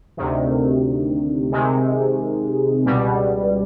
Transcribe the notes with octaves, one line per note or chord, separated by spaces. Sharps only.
D2 C3 D#3
C3 D#3 G#3
C#2 B2 G3